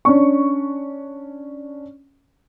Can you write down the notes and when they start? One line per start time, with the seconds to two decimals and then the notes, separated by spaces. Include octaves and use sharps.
0.05 C#4 D4 C#6